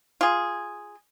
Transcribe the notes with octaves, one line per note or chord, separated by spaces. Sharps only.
F4 G#4